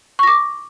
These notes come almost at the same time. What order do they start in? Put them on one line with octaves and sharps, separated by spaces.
C#6 A#6 D6